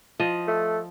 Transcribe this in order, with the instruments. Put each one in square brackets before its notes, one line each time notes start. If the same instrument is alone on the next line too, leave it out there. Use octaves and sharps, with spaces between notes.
[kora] F3 D#5
[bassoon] A3